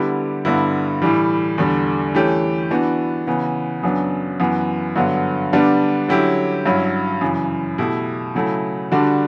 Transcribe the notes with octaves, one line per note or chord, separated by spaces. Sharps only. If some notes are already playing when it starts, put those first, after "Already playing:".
Already playing: D3 G3 B3 E4 G4
G2 D3 G3 B3 E4
A2 E3 G3
E2 D3 G3
E3 A3 C#4 G4
E3 B3 D4 F#4
C#3 E3 B3
F#2 C#3 F#3 B3 D4
F#2 E3 B3 F#4
G2 D3 F#3 B3
D3 G3 B3 D4
D3 F#3 C#4 E4 G4
G2 F#3 C#4 E4
F#2 C#3 E3
B2 A3 E4 G4
C#3 F#3 A3 E4
D3 G3 D4 F#4